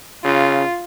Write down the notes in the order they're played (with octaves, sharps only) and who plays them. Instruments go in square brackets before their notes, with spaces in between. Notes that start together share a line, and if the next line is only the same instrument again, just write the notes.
[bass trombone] C#3 [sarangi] F4